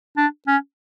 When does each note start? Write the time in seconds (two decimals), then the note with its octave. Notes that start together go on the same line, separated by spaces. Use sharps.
0.17 D4
0.47 C#4